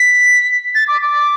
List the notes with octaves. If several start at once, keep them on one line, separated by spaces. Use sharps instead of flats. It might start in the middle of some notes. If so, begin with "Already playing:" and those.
Already playing: B6
A6
D6
D6